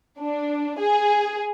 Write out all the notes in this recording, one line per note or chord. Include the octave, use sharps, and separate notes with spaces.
D4
G#4